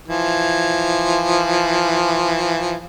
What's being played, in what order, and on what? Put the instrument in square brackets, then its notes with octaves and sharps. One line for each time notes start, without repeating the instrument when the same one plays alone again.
[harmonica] E3 F3